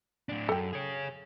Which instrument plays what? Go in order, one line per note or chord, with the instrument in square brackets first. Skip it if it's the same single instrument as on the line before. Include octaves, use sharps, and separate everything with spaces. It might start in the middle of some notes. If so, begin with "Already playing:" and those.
[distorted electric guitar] A2 D4
[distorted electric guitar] F#2 [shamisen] A4 G5
[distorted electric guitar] G#4 C#5